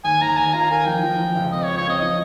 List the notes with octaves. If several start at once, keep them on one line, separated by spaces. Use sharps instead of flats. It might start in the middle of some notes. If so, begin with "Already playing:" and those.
D#2 G#5
D#2 A#5
D#2 G#5
F4 A#5
A#4 G#5
F3 G5
F3
F3
C#2
C4 D#5
C#5
F4
C#5
C4 D#5
F3 D#5